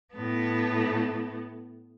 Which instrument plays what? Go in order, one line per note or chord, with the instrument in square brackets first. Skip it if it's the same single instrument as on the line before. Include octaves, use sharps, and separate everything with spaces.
[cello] A2 B3